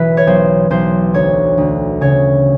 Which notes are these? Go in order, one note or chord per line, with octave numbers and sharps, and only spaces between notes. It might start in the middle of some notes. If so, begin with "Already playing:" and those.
Already playing: B1 E3 B4
C#5
B1 C5
B1 C5
D2 C#5
D2
C#3 C#5